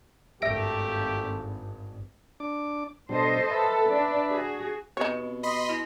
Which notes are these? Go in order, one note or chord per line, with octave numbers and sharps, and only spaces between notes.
G#1 G2 A3 A#3 G4 E5 A#6 D7
D4 D6
B2 G3 D4 A4 C5 D#5
A4 B4 E5 A5
D4 D5
F#4 G#4
B2 C4 D#4 G4 B4 C#5
D#5 B5 C6
E4 F#4